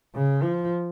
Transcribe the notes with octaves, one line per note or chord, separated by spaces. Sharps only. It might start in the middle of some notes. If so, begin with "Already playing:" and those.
C#3
F3